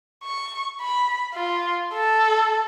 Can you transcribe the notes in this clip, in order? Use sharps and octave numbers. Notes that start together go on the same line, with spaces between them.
C#6
B5
F4
A4